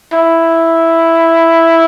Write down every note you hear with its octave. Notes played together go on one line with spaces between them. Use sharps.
E4